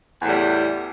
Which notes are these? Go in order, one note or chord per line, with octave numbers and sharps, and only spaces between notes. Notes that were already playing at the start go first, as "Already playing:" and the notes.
E2 A2 G3